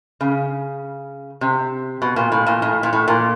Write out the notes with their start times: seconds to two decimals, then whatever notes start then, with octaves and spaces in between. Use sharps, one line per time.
0.21 C#3
1.41 C3
2.02 B2
2.16 A#2
2.32 A2
2.46 A#2
2.62 A2
2.83 A#2
2.93 A2
3.08 A#2